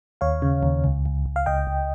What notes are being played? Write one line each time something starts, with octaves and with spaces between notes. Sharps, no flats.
D#2 C#5 F5
C#3
D#2
C#2
C#2
C#2
F5
C#2 D#5 G5
C#2